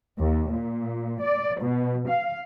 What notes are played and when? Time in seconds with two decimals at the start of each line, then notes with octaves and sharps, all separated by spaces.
0.18 D#2
0.53 A#2
1.22 D5
1.60 B2
2.08 F5